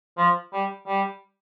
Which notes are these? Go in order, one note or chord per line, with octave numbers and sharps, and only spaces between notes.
F3
G3
G3